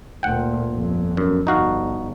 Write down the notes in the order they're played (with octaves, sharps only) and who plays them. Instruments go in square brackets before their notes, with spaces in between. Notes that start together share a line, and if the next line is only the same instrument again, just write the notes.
[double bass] D2 A#2 [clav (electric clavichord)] F#5 G5
[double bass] G1 F2
[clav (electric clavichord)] F#2
[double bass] G1 [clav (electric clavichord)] D#4 F#4 F5